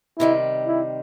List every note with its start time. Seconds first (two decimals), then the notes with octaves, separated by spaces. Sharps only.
0.19 C3 D#3 G3 E4
0.67 E4